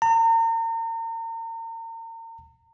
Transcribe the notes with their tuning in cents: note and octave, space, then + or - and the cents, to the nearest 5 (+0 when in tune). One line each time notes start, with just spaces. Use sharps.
A#5 -40